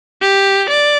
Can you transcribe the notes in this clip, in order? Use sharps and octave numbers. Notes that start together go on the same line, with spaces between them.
G4
D5